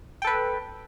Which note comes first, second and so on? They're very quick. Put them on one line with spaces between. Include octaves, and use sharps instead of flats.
G5 A4 B4